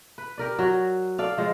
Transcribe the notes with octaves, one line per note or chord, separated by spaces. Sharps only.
B4
G4 A#4 D5
F#3 F#4
A4 D5 F5
F3 G#3